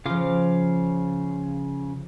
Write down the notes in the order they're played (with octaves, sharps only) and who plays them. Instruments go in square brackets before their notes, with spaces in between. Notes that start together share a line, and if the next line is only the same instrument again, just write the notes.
[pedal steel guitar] C#3 F5 D6 [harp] F3 F4